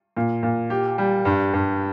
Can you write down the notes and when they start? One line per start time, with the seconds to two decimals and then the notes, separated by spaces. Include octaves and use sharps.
0.17 A#2
0.43 A#2
0.70 G4
0.98 G3
1.25 G2
1.54 G2